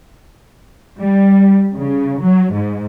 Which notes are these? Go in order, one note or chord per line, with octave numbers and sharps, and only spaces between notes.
G3
C#3
F#3
G#2